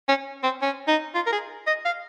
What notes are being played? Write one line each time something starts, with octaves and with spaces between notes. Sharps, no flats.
C#4
C4
C#4
D#4
F4
A#4
G#4
D#5
F5